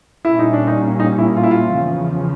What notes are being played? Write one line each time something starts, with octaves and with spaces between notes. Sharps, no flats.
A#2 G3 A#3 C#4 E4
D#4
D4
D#4
D#4
E4
F4
E4
F4
E2 C#3 F3